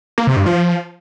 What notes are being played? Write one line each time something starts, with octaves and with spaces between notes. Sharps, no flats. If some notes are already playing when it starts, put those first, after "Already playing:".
A#3
C3
G2
F3